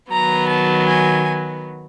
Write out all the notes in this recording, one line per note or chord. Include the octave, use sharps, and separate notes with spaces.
D#3 F#3 B3 A#5
A5
G#5